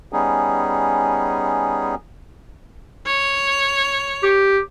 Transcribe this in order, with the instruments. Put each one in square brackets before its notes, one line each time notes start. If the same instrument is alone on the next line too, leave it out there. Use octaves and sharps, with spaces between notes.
[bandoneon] G3 B3 C#4 D#4 G#4
[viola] C#5
[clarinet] G4